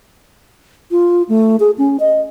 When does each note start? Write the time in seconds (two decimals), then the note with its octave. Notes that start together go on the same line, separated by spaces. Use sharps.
0.91 F4
1.29 A3
1.60 G#4
1.78 C#4
2.00 D#5